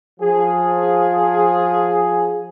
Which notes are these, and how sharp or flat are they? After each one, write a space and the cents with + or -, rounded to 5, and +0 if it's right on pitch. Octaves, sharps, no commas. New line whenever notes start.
F3 +20 G#4 +0